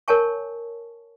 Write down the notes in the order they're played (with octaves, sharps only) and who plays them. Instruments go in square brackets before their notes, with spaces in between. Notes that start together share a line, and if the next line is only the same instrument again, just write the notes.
[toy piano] A#4 C#5 G#5 A5 C#6